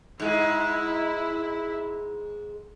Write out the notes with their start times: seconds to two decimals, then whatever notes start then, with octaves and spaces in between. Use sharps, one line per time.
0.20 G#2 G#3 E4